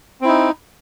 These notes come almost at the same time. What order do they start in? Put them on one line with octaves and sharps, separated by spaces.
C4 E4 D#4